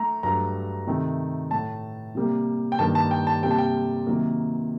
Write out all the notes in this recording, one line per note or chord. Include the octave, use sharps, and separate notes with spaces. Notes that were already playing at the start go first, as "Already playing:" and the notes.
Already playing: A3 A#5
G2 F#3 A3 A#5
C3 D#3 A3
A2 A3 A5
C3 G3 A#3
G5
G2 D#3 G3 A#3 A5
A5
G5
A5
C3 G3 A#3 G5
A5
G5
C3 D#3 F#3 A#3